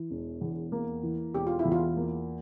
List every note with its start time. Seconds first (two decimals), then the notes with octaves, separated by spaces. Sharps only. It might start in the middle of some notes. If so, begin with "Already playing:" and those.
Already playing: E3
0.11 E1
0.41 E2
0.72 A#3
1.03 E3
1.35 E1 G4
1.47 F4
1.59 E4
1.65 E2
1.72 F4
1.97 A#3